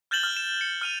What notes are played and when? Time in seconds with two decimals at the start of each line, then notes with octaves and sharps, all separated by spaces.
0.11 F6 G6 A6 E7 F#7 G7
0.23 F6
0.37 E7
0.61 C#7
0.81 F6 D#7 F7